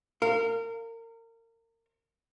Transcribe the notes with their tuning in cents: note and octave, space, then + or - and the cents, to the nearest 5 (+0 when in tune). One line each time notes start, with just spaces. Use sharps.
A#4 -30 F5 +0